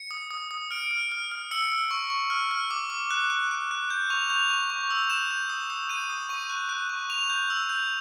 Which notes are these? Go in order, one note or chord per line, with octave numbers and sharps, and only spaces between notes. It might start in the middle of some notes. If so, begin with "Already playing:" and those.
Already playing: C#7
D#6
D#6
D#6
F6 D7
F6
F6
F6
E6 C#7
E6
C#6
C#6
F6
F6
D6
D6
F#6
F#6
F#6
F#6
G6
C#6 F7
G6 F7
C#6
C#6
E6
G6 E7
G6
D#6
D#6
G6 D#7
D#6
C#6 D#7
F#6
F#6
C#6
C#6 F7
G6
E6
G6